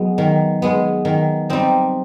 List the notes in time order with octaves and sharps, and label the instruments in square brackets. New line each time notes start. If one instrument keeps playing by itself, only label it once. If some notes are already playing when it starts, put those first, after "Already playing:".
Already playing: [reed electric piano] F#3 [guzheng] G#3 B3
[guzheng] D#3
G#3 B3
D#3
G3 C4 D#4